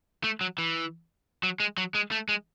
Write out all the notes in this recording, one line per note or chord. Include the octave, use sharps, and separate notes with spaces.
A3
F#3
E3
F#3
G#3
F#3
G#3
A3
G#3